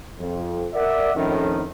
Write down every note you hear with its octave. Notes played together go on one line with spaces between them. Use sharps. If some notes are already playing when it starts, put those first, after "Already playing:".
F2
A#4 D5 E5 F#5
F2 A2 D#3 C#4